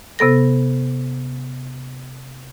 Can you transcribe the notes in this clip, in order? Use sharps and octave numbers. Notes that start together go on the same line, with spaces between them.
C3 B3 A4 A#6